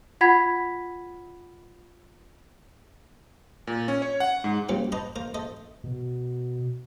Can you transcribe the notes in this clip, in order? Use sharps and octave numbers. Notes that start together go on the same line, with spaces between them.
F4 F#5 B5 G#6 B6
A#2
C#4
C#5
F#5
G#2
G2 C#3 F#3 A#3 C4 F4
B4 C5 D#5 A5 A#5 C6
A#4 C5 F5 A#5
A4 C5 D#5 E5
B2